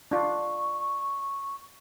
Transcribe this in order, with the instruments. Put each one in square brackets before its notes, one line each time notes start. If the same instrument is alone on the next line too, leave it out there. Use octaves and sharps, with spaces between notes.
[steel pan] D4 F4 [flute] C#6